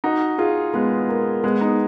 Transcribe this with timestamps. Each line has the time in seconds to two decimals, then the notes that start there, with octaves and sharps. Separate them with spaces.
0.04 D#4 F#4
0.38 F4 G#4
0.74 G#3 B3
1.09 A#3
1.44 G#3 B3
1.60 B3 D#4